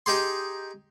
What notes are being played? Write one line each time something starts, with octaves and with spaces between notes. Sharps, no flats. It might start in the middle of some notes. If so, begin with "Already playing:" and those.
D#4 G4 G#4 C6